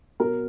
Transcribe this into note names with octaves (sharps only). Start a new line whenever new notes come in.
B2 F#3 A#4